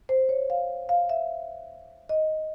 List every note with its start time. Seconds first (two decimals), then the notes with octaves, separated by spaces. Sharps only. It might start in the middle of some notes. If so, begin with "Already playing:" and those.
0.09 C5
0.29 C#5
0.50 F5
0.89 F5
1.09 E5
2.09 D#5